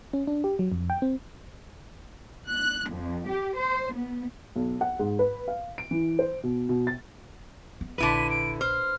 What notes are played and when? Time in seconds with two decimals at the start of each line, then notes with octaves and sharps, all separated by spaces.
0.13 C#4
0.27 D4
0.44 G4
0.59 F#3
0.72 F2
0.90 G5
1.02 C4
2.50 F#6
2.93 F2
3.29 G4
3.59 C5
3.95 B3
4.56 B1
4.81 F#5
4.99 G#2
5.19 B4
5.48 F5
5.78 D7
5.91 E3
6.19 C5
6.43 B2
6.69 B2
6.87 A6
7.81 B3
7.98 A#1 D3 E4 B4 D#7
8.30 D7
8.61 C5 F6